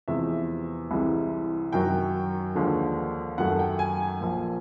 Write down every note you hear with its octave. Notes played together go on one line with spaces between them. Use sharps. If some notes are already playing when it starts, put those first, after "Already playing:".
E2 C3 F3 G#3 E5
C2 C3 E3 G#3
F#2 D#3 F#3 G5
D#2 D3 F3 G#3
F#2 D#3 F#3 A3 F#5
G5
G#5
A#1 A#2 F3 A#3